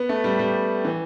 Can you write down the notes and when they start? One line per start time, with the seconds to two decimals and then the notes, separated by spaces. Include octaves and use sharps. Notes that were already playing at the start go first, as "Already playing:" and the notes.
Already playing: B3
0.09 A3
0.24 G3
0.39 G3
0.85 E3